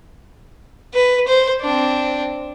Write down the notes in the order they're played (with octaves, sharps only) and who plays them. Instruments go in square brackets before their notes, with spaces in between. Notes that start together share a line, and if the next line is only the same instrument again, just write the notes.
[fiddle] B4
C5
C4 D4